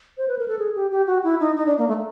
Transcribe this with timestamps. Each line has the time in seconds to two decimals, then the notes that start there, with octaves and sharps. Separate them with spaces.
0.18 C5
0.28 B4
0.39 A#4
0.48 A4
0.59 G#4
0.75 G4
0.91 G4
1.07 F#4
1.24 E4
1.40 D#4
1.56 D#4
1.66 D4
1.78 A#3
1.88 A3